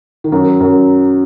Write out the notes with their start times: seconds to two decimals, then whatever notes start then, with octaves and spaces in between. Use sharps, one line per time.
0.24 D#3
0.32 F#2 F#3
0.60 F#2 F#3